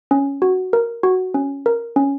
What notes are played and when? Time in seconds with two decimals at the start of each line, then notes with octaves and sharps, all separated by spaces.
0.11 C#4
0.42 F#4
0.73 A#4
1.03 F#4
1.34 C#4
1.66 A#4
1.96 C#4